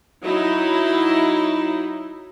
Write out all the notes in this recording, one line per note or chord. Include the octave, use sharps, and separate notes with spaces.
F#3 D#4 E4